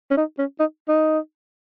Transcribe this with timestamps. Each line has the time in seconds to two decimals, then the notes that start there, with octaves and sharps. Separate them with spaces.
0.11 C#4
0.17 D#4
0.38 C#4
0.60 D#4
0.88 D#4